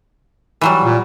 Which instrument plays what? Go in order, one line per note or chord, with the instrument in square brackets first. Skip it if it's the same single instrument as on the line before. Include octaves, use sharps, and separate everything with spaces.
[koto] E3 F#3 G3
[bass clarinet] A#2